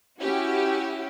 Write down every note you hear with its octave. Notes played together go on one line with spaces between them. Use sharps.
C#4 E4 F#4 G4